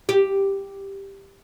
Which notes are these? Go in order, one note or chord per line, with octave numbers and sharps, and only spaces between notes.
G4